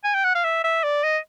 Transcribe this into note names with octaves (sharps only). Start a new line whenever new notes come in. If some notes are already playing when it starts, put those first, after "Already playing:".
G#5
G5
F#5
F5
E5
E5
D5
D#5